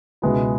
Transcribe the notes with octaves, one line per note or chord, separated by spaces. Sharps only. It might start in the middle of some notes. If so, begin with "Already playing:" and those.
C#2 B2 G#3 B3 E4